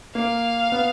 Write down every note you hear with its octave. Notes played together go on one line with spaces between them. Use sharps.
A#3 F5
B3